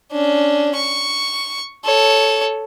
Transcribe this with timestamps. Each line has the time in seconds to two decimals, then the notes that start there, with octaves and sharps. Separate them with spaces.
0.12 C#4 D4
0.75 C#6
1.84 A4 C#5